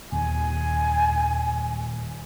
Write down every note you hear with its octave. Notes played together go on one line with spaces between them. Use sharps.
D#1 D#2 G#5